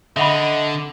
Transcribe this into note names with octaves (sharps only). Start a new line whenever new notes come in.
D3 D#5 E5 F#5 B5